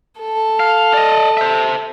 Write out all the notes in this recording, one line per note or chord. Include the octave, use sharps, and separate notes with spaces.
A4
F5
D5 D#5
C5 E5